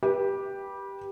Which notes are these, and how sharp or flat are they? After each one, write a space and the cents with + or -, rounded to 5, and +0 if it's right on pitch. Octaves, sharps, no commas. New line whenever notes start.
G4 +0 B4 -25